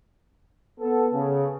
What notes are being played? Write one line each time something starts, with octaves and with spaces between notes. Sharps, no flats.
B3 A4
C#3